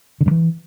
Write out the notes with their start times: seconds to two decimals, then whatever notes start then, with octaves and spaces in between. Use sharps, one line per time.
0.21 D3
0.26 G2
0.31 E3